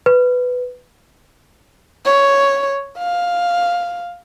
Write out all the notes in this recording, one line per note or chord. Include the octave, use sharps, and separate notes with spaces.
B4
C#5
F5